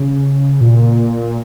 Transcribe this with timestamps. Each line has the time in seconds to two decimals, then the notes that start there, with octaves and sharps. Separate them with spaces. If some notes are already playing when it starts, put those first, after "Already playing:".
Already playing: C#3
0.61 A#2